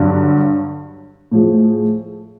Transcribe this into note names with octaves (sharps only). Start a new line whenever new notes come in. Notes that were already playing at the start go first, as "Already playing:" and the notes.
Already playing: G2 D3 F#3
A2 F3 G#3